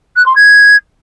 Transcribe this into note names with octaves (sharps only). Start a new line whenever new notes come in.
F#6
C6
G#6